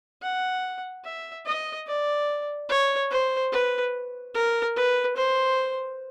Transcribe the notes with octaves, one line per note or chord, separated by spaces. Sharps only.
F#5
E5
D#5
D5
C#5
C5
B4
A#4
B4
C5